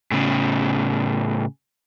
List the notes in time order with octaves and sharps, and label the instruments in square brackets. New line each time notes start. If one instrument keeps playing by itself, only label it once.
[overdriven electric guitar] A2 C#3